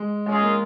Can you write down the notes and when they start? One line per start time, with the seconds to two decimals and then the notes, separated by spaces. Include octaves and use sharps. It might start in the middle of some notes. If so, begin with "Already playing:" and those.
Already playing: G#3
0.26 G#3 C#4 F4 G#4 D#5
0.41 A#3